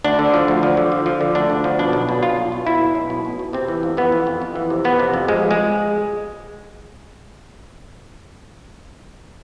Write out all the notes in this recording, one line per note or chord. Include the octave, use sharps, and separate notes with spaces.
D2 D4
D3
F3
D2
F3
D3
F3
F3
D3
D2 D4
D2
F3
B2 D4
B1
B2
B1 F4
B1
B2
B2 E4
B1
B1
B2
B2
B2
C3 C4
E3
F2
E3 B3
F2
F2
F2
E3
C3
F2 B3
C3
F2
F3 G#3
G#3